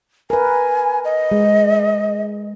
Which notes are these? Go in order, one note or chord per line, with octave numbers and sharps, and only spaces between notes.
A#4 B4 G#5
D#5
G#3